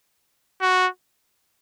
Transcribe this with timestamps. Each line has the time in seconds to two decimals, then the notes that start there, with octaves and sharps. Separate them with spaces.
0.61 F#4